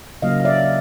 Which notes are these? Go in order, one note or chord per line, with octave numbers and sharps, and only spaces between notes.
C#3 F#3 A#3 D#5 F5
F5
D5 E5